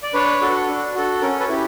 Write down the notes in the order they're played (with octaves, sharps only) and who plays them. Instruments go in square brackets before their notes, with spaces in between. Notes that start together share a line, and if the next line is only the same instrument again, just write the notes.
[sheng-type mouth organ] D5
D4 B4 C#5
F#4 A4
D4
F#4 A4
C#4 A#4
A4 B4
E4 G4